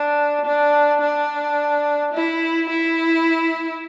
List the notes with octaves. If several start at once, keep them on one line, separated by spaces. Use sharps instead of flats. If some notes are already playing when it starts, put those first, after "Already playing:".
Already playing: D4
D4
D4
E4
E4